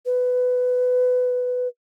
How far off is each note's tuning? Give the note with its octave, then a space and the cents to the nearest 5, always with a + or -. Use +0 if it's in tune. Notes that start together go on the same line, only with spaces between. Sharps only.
B4 +15